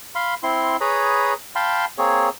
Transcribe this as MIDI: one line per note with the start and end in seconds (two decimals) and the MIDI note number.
0.15 0.34 77
0.15 0.34 83
0.15 0.34 84
0.43 0.76 60
0.43 0.76 64
0.43 0.76 84
0.81 1.33 68
0.81 1.33 71
0.81 1.33 73
0.81 1.33 82
0.81 1.33 83
0.81 1.33 87
1.56 1.85 77
1.56 1.85 79
1.56 1.85 81
1.56 1.85 83
1.56 1.85 84
1.98 2.29 58
1.98 2.29 60
1.98 2.29 68
1.98 2.29 73